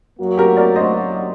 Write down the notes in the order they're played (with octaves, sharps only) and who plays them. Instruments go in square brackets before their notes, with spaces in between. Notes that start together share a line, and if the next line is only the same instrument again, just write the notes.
[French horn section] F#2 F#3 A#3 F#4
[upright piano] G4 A#4
A#4 D5
C5 D#5